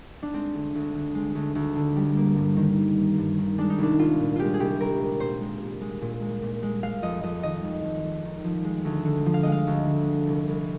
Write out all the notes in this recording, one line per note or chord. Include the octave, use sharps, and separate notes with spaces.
D4
G#3 C4
D2
D2
D3
G#3
D2
D2
D3
G3
A#3
G2
D#3
G3
A#3
G2
D#3
G#3 D4
D#4
C2 D4
C2 F4
A#2
G#3 F4 G4
G#4
C2 G4
C2 A#4
A#2
A#2 C5
G#3
A#2
G#3
A#2
G#3
A#2
G#3
G#3 F5
F2 D#5
F2 D#5
D#3 D#5
G#3
F2
F2
D#3
F3
G#3
D2
D3
F3
F5
G#3 D#5
F5
D2
D3
G#3
C2
C2